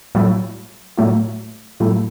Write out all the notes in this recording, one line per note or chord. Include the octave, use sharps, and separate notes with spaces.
A2 F#3 A3 E4
A2 F#3 A3 E4
A2 F#3 A3 E4